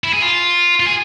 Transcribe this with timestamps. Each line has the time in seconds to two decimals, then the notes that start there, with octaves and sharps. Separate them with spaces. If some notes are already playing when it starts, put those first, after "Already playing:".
0.04 E4
0.13 G#4
0.22 F4
0.80 F4
0.87 G#4